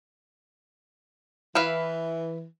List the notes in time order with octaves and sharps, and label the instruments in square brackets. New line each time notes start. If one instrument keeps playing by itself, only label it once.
[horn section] E3 [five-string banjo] E4 B4 F5